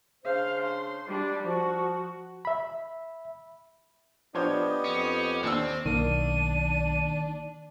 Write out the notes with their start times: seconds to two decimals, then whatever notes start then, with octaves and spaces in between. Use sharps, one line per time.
0.25 C#3 D4 C5 F5
0.63 C6
1.07 G3 D4
1.44 F3 F#4
2.45 E5 B5
4.35 F3 B3 D4 G4 C5 C#5 D#5
4.84 F2 C#4
5.43 D#2 C4 D4 E6
5.86 B1 D#3 A#3 D4 D#7